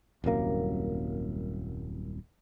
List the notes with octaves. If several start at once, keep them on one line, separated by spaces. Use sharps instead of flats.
D#1 C2 F#2 A#3